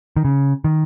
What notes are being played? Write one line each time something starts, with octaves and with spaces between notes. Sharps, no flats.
D#3
C#3
D#3